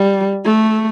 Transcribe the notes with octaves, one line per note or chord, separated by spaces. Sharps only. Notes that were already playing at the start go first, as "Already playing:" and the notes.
Already playing: G3
A3